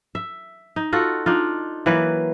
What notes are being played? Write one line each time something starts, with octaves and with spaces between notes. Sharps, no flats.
E5
D#4
F4 F#4 A4
D4 D#4 F4
E3 F#3 A#3 B4